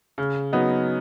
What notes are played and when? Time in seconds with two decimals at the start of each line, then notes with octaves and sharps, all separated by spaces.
0.18 C#3
0.53 F#3 B3 D#4